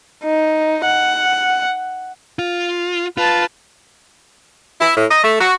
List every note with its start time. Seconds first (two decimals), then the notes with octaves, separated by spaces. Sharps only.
0.25 D#4
0.86 F#5
2.39 F4
3.17 F4 B4 A5
4.81 E4
4.96 A2
5.11 D#5
5.24 A3
5.41 F#4